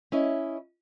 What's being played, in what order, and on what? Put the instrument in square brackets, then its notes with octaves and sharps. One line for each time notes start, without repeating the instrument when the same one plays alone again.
[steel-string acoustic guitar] C#4 E4 D#5